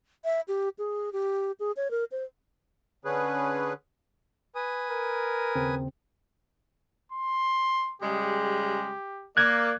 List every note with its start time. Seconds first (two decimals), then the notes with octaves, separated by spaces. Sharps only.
0.24 E5
0.48 G4
0.79 G#4
1.13 G4
1.60 G#4
1.77 C#5
1.91 A#4
2.12 C5
3.05 D3 C#4 G#4 B4
4.55 B4 G#5 D#6
4.89 A#4
5.56 D#2 C#3 C4
7.12 C6
8.02 C#3 G3 G#3 G4
9.37 A#3 D5 F#6 G#6